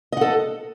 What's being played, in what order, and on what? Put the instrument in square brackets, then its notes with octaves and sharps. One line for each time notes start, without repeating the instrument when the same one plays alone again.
[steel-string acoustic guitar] D#5
F#5
A4